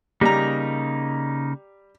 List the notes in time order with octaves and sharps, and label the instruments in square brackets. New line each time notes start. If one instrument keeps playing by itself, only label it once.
[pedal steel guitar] C#3 A#3 D#4 [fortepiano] G3 A#5